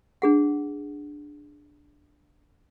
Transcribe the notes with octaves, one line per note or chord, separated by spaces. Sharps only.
D4 G#4 F#5